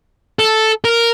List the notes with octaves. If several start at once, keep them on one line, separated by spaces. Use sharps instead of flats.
A4
A#4